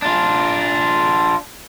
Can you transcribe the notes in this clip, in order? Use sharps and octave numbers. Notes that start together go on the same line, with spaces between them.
D4 F4